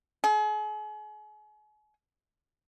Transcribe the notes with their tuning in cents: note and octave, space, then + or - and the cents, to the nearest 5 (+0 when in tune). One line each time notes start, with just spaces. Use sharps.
G#4 +40